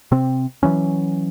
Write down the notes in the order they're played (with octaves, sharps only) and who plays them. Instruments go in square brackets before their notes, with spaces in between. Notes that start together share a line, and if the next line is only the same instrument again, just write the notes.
[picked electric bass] C3 C4
E3 F#3 C#4